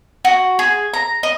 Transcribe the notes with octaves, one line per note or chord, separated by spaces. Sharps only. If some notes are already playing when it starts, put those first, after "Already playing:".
F#4
G#4
A#5
D#5